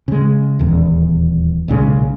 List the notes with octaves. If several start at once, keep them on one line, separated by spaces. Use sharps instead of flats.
C#3 G#3
D#1 E2
B1 A#2 C#3 G#3